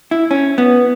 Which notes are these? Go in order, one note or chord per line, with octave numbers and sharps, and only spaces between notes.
E4
C#4
B3